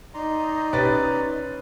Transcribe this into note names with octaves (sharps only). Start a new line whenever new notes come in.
D#4 D5 A#5 C6
A1 B2 C#4 G4 B4 A6